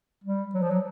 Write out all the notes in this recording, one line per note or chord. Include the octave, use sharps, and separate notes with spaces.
G3
F#3
F3
F#3